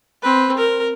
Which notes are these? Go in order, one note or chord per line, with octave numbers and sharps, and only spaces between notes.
C4 B4
A#4